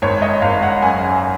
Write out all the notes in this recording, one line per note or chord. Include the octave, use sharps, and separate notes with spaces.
G#1 C#5
D#5
G#1 F5
F#5
F#2 G#5